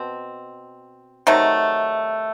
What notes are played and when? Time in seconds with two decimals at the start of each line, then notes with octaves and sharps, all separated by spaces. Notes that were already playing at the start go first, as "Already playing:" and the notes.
Already playing: B2 C4
1.27 C3 D#3 F#3 A3